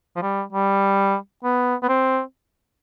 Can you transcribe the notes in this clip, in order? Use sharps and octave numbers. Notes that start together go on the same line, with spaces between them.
F3
G3
G3
B3
B3
C4